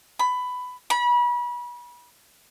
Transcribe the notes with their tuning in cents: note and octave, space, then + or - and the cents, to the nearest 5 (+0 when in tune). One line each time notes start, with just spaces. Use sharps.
B5 +15
B5 -30